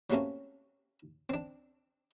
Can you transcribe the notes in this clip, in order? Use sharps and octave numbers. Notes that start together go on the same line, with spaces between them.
F#3 G3 A3 A#3 C4 C#4
C4 D4